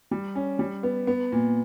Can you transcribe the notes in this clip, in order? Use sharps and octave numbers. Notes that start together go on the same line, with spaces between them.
G3
C#4
G3
B3
B3
A#2